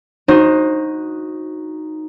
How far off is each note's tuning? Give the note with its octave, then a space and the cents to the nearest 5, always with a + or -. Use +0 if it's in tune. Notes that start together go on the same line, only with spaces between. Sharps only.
D#4 +0 F#4 -10 C5 +25